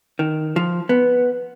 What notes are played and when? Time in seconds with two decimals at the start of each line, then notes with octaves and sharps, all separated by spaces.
0.19 D#3
0.56 F3
0.89 B3